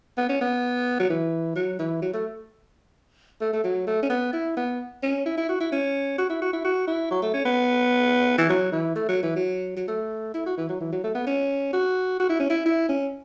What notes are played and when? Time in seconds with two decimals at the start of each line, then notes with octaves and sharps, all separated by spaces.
0.17 B3
0.29 C#4
0.41 B3
1.00 F#3
1.10 E3
1.56 F#3
1.79 E3
2.02 F#3
2.13 A3
3.41 A3
3.53 A3
3.64 F#3
3.87 A3
4.03 C#4
4.10 B3
4.33 E4
4.57 B3
5.03 C#4
5.26 E4
5.38 E4
5.49 F#4
5.60 E4
5.72 C#4
6.18 F#4
6.30 E4
6.42 F#4
6.53 E4
6.65 F#4
6.87 E4
7.11 F#3
7.22 A3
7.34 C#4
7.45 B3
8.38 E3
8.49 F#3
8.72 E3
8.96 A3
9.09 F#3
9.23 E3
9.36 F#3
9.77 F#3
9.88 A3
10.34 E4
10.46 F#4
10.57 E3
10.69 F#3
10.81 E3
10.92 F#3
11.04 A3
11.15 B3
11.27 C#4
11.73 F#4
12.20 F#4
12.29 E4
12.40 C#4
12.50 E4
12.66 E4
12.89 C#4